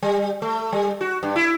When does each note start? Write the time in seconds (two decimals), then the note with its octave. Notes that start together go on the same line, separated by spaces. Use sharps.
0.03 G3
0.42 A3
0.73 G3
1.01 F#4
1.23 G2
1.36 E4